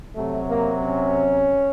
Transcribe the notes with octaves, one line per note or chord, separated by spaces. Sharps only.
C3 F#3 A3
A#3
C#4